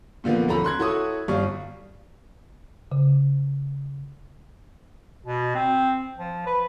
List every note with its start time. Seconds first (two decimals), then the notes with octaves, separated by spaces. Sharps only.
0.24 A#2 D3 F3 A#3 B3
0.48 D#1 F3 C#4 A4 A#5 B5
0.64 C6 F#6 G#6
0.79 E4 F#4 A4 C#5 C#6 D#6
1.28 G1 G3 D5 F5 C#6
2.92 C#3
5.26 B2
5.55 C4
6.18 F3
6.46 B4